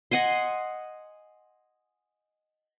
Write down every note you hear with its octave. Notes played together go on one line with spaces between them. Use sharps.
D#5 F#5 G#5 C6